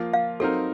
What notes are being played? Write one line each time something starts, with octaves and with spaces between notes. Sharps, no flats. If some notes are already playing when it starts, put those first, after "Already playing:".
Already playing: F3 A#3 F4
F5
F#3 C4 D#4 A4 A#4